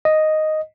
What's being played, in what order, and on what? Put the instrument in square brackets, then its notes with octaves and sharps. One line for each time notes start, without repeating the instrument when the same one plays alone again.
[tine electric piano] D#5